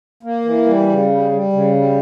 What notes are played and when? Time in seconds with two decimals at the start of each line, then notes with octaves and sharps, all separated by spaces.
0.23 A#3
0.45 E3
0.66 G3
0.88 C#3
1.09 G3
1.31 G3
1.53 C#3
1.74 G3